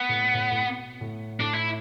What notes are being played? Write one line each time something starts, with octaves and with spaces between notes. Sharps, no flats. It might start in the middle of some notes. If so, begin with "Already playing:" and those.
Already playing: B3
A2
A2
A2
B2
A2
A2 D4
E4